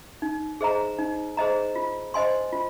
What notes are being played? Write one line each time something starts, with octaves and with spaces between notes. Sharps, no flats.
D#4
G#4 C5 D#5 A#5
D#4
G#4 C5 D#5 A#5
F4
C5 D#5 G#5 C6
F4